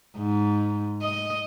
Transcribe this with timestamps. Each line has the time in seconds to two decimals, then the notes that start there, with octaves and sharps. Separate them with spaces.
0.17 G#2
1.02 D#5